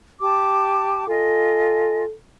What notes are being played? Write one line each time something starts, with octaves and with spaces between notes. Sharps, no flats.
G4 A5 D6
F4 A4 D#5 G#5